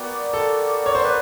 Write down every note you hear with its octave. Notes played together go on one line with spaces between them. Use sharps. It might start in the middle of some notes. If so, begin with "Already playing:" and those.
Already playing: B3 F#4 A#4 D5 G5
A4
C#5
C5
B4